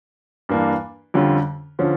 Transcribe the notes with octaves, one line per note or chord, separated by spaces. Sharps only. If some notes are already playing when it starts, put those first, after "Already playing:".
G2 E3 A#3 D4
F2 D3 G3 C#4 F4
D3 F3 C#4